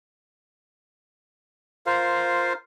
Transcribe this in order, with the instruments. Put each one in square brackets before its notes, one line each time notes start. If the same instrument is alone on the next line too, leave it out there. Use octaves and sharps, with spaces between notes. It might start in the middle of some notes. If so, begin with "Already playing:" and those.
[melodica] F4 A#4 C5 F5